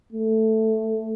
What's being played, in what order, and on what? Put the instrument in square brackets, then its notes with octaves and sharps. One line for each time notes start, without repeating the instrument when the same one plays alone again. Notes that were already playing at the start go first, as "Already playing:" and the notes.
[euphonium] A3